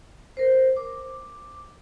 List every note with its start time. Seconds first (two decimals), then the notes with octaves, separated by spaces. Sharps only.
0.37 A#4 C5
0.77 D6